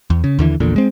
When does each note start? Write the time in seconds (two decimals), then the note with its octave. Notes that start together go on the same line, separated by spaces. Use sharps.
0.10 E2
0.24 C#3
0.39 D#2 D3 E3
0.60 A#1 E2 A#2 D3
0.76 G#3 C4